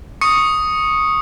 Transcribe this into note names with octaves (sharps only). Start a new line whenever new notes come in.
C#6 D#6 C#7